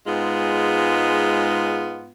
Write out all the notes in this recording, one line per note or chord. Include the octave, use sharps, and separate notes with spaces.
G#2 G#3 B3 F4